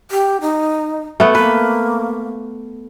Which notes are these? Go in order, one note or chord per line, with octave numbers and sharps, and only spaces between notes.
G4
D#4
A3 B3
A#3 B4